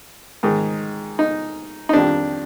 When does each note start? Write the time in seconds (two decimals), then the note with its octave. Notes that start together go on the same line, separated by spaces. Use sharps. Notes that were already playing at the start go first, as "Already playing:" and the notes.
0.43 G#2 D#3 G#3
1.19 D#4
1.89 D#4
1.93 F2 D#3 G3 D4